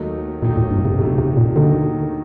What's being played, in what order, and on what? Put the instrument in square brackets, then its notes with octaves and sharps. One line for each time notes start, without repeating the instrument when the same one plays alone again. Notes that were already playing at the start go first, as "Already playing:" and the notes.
Already playing: [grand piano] D#2 D#3 F#3 A3 D#4
[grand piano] D#2 D#3 F#3 A3 D#4 [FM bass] A#2
[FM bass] A2
G2
C3
[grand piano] D#2 D#3 F#3 A3 D#4 [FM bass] C3
[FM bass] C3
A#2
[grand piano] D#2 D#3 F#3 A3 D#4 [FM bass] D3